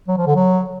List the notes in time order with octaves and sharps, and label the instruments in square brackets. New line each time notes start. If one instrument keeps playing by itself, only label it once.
[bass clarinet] F#3
F3
D3
F#3